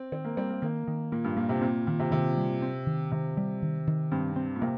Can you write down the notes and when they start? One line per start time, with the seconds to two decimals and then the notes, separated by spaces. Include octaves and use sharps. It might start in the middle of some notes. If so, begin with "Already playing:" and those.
Already playing: C4
0.12 D#3 C4
0.25 A#3
0.37 G3 C4
0.50 A#3
0.62 D#3 A#3
0.88 D#3
1.12 A#2 A#3
1.24 G2
1.37 A#2 A#3
1.49 C3
1.61 A#2 C4
1.87 A#2 D#3
1.99 C3
2.12 C3 D#3
2.37 G3
2.62 C4
2.86 D#3
3.12 C3 D#3
3.37 G3
3.62 D#3
3.87 D#3
4.12 G2 C4
4.36 C4
4.56 A#2
4.62 C3 A#3